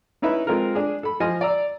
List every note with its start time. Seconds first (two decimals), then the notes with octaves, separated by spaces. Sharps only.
0.22 C#4 D#4 E4 B4 E5 B5
0.47 G#3 C4 F4 A4 A#4
0.75 D4 G#4
1.03 A4 B5
1.20 F3 D#5 G#5 C6 F6
1.41 D5 A#5 E6